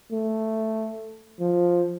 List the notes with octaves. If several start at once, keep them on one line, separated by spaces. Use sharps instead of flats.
A3
F3